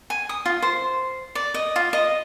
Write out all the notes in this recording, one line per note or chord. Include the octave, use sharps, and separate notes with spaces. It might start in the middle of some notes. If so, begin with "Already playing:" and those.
G#5
D#6
F4
C5
D5
D#5
F4
D#5